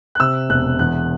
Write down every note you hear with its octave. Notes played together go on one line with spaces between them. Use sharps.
F#6
C3 E6
E1 F#6
E2 F#6